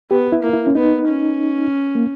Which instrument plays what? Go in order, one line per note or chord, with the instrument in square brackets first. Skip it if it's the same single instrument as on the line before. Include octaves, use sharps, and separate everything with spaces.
[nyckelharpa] B3 [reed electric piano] G4
[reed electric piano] E4
[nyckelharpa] A#3
[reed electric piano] E4
C#4
[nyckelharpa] B3 [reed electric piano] D#4
[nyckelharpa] C#4
[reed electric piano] A#3